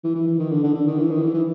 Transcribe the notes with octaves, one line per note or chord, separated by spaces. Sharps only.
E3
E3
E3
D#3
D3
D3
D3
D#3
E3
D#3
E3
E3